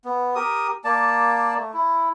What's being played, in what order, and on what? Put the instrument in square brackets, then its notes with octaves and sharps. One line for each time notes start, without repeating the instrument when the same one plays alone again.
[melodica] B3
G4 A#4 D#6
A#3 D5 A5
A3
E4